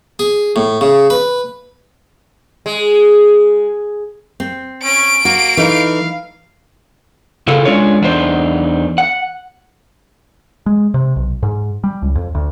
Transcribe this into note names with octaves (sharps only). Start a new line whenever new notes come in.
G#4
A2
C#3
B4
G#3
C4
C#4 D7
A#3 F#4
E3 A3 D#4 F5
C#3 E4 F4 A4
G#3 C#4 D4 F4 C#5
E2 D4 D#4 C5
F#5
G#3
C3
B1
G#2
G3
C#2
F2
D2